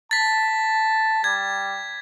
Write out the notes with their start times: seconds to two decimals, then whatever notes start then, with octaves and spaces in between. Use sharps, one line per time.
0.11 A5 A6 B6
1.24 G3 G#6